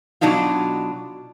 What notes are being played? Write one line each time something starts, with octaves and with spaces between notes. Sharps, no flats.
B2 F#3 D4 D#4 F4